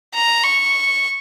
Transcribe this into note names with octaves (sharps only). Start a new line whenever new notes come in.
A#5
C#6